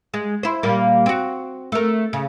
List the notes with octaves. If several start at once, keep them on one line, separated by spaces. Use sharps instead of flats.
G#3
E4 C5
A#2 G3 A#3
C4 F#4
A3 A#4
C#3